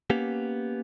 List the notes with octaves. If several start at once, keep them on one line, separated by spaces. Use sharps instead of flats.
A#3 B3 C#4 G4